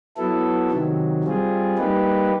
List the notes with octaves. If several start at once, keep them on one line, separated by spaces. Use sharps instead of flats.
F#3 B3 E4 A4
C3 D#3 F#3
G3 C4 F4 G#4
G3 A#3 D#4 G4 B4